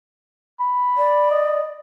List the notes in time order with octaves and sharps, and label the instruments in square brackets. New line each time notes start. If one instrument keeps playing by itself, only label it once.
[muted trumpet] B5
[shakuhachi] D5
[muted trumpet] D#5